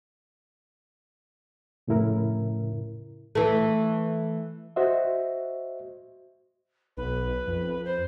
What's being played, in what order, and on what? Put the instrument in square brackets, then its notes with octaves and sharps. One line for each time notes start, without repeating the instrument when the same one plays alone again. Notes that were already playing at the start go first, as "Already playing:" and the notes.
[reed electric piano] F2 A2 C#3 E4 A#4
[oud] E3 A3
[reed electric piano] F#4 C5 D#5 E5
[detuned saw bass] B1 [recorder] B4
[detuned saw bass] F2
[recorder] C5